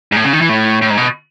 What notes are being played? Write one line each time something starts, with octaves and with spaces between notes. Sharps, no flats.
G#2
A2
C#3
D#3
E3
A2
A2
G#2
B2